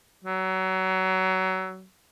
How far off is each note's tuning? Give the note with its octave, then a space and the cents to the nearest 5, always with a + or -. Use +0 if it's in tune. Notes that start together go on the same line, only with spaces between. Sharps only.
F#3 +25